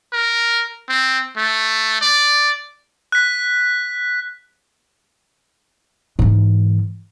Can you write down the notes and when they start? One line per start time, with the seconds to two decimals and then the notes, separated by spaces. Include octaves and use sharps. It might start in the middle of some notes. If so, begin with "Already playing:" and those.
0.13 A#4
0.89 C4
1.37 A3
2.01 D5
3.12 F#6 B6
6.19 G#2 E3